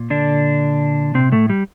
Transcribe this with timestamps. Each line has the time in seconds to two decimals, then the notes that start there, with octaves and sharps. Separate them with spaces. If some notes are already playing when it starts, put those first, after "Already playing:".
Already playing: A#2
0.10 D3 D4
1.14 C3 C4
1.32 A2 A3
1.50 G3